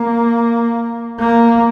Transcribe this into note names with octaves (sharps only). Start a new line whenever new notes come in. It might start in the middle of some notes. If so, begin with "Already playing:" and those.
Already playing: A#3
A#3